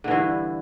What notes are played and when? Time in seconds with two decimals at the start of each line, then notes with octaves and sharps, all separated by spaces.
0.04 D3
0.08 E3
0.11 G2